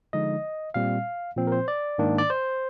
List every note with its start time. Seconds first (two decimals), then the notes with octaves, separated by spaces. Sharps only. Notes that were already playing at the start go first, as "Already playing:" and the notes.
0.13 D3 F3 G#3 D#4 D#5
0.74 A#2 G3 C4 F5
1.37 A#2 F3 C4
1.47 A#4
1.52 C5
1.68 D5
1.98 G#2 D#3 A#3 D4
2.18 D5
2.30 C5